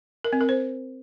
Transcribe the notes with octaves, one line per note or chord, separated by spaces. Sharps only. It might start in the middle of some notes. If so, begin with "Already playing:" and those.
A#4
C4
A#4
C5